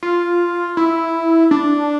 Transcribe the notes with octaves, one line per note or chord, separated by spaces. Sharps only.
F4
E4
D4